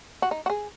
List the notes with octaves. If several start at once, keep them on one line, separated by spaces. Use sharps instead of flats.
F#4
D#4
F#4
G#4